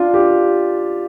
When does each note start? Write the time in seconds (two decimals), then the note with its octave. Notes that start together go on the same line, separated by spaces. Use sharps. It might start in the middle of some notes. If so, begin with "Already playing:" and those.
Already playing: D4 F4
0.14 G4